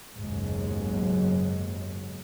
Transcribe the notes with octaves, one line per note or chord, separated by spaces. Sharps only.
F#1 D#2 G#2 B2 F#3 G#3